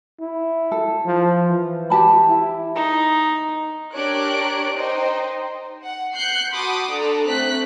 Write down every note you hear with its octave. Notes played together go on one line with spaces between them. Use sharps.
E4
A4
F3
E3
G4 A5 B5
E4
D#4
D4 G4 A#4 C#5 F#6 D7
D#4 C5 G5
F#5
F#6 G6 C7 C#7
F#4 A5 B5 C6 D6 D#6
D4 A4 A#5
A3 C4 F#6 B6